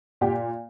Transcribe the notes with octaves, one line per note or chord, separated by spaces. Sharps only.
A#2 G4